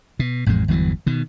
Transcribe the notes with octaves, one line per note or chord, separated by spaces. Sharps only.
B2
A1 F2 A2 G#3
G1 E2 E3 F#3
B2 D#3